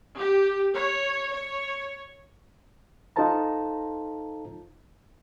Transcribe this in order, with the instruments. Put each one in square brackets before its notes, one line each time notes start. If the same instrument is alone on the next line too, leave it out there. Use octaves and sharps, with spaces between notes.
[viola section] G4
C#5
C#5
[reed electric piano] D#4 F4 A4 C5 A5 A#5